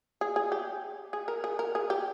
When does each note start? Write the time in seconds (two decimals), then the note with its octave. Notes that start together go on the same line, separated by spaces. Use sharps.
0.21 G#4
0.36 G#4
0.52 G4
1.13 G#4
1.28 A#4
1.44 G#4
1.59 A#4
1.75 G#4
1.90 G4